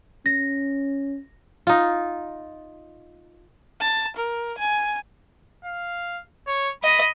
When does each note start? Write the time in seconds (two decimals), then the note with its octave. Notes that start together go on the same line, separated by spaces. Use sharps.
0.26 C#4 A#6
1.67 D#4 F4
3.81 A5
4.17 A#4
4.58 G#5
5.64 F5
6.47 C#5
6.83 D#5 B5